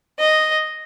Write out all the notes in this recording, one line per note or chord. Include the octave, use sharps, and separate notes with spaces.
D#5